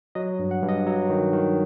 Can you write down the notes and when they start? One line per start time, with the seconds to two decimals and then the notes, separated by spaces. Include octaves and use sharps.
0.15 F#3 D#5
0.39 G2
0.51 F#5
0.62 G2
0.69 D#5
0.86 F#3
1.10 D#3
1.33 D#3